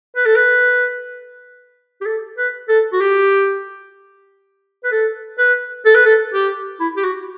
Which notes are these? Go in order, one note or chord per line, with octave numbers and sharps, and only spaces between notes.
B4
A4
B4
G4
A4
B4
A4
F#4
G4
B4
A4
B4
A4
B4
A4
G4
E4
G4
F#4